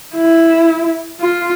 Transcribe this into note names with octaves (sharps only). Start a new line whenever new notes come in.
E4
F4